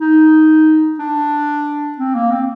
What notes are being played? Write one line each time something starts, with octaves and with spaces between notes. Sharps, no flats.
D#4
D4
C4
A#3
C4